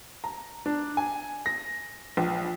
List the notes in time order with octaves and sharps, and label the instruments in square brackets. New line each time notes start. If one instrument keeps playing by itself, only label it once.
[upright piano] A#5
D4
G#5
A#6
A#1